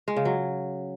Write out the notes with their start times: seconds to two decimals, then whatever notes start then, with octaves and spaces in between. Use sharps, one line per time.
0.08 G#3
0.17 C#3
0.25 F#3